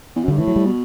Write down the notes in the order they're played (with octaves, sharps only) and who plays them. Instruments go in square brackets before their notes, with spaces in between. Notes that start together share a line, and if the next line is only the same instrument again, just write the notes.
[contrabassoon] E2
F#2
[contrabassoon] G2 [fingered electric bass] D3
[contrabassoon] A2 [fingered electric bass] E3
[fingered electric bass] F#3
G3
[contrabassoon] B2